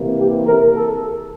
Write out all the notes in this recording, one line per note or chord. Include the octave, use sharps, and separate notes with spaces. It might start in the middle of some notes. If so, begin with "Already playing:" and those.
Already playing: C3 E3 A#3
G4
A#4
A4